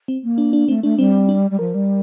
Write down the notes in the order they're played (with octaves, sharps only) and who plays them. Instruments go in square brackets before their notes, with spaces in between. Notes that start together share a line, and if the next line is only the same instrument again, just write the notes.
[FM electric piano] C4
[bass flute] A#3
[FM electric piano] D4
D4
[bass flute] A3 [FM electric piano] C4
[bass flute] A3 [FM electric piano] D4
[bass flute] G3 [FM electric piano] C4
[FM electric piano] D4
[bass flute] G3
[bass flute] F3 [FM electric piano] A#4
[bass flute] G3